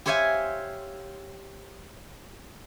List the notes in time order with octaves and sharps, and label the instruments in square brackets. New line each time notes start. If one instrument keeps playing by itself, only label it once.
[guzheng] G4 C5 C#5 E5 F5 G#5